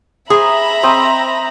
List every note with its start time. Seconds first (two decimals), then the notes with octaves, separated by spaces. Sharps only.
0.30 G#4 C5 E5 A#5 B5
0.83 C4 D#5 G5